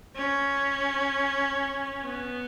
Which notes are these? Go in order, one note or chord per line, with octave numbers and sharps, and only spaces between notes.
C#4
B3